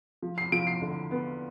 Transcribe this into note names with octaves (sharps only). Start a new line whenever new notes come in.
F3
C7
F3 D7
C7
D3
B3